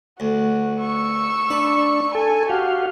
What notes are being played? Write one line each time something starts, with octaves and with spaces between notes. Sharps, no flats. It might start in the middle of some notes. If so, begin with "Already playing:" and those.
D2 F#4
C#6 E6
D4 B4
A4 G#5
F#4 G4 F5